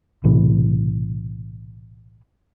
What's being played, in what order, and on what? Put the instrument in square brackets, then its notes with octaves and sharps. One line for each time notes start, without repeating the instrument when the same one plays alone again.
[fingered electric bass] B1 A2 C3 E3